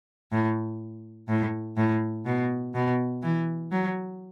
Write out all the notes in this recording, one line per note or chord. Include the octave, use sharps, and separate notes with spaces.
A2
A2
A2
B2
B2
E3
F#3